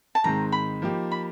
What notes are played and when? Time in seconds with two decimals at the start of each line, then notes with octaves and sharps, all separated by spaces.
0.15 A5
0.24 G#2 D#3 G#3 C4 A#5
0.52 B5
0.82 F3 A#3 D#4 G4
1.12 B5